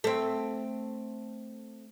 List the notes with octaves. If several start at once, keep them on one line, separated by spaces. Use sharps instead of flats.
A3 C4